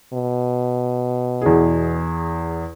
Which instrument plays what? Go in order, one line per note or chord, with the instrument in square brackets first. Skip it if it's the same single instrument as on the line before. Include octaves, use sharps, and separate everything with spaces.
[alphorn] B2
[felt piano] E2 G#4